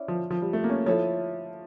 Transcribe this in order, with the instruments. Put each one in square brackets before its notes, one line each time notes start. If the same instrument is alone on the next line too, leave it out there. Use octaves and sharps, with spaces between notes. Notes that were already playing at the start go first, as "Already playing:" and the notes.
Already playing: [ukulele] C#4 E4 D5
[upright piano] F3
F3
G3
A3
A#3
C#4
[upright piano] F3 [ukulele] E4 A4 C#5